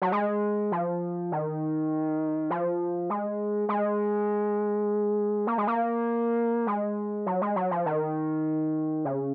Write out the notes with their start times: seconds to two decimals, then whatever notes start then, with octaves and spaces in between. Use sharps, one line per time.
0.02 F#3
0.12 G#3
0.72 F3
1.32 D#3
2.50 F3
3.10 G#3
3.69 G#3
5.47 A#3
5.58 G#3
5.67 A#3
6.67 G#3
7.26 F#3
7.42 G#3
7.56 F#3
7.71 F3
7.86 D#3
9.05 C#3